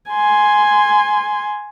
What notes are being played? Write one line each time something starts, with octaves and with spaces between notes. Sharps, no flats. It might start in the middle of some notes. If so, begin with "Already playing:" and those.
G#5 C6